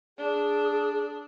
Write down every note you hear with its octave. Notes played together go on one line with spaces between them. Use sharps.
D4 G#4